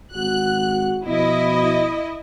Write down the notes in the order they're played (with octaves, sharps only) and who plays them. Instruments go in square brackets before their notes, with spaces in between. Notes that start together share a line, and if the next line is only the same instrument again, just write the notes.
[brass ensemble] G#1 F#4 [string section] F#6
[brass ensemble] B2 F3 [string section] E4 D#5